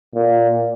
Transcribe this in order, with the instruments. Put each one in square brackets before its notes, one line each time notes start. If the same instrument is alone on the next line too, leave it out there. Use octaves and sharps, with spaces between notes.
[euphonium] A#2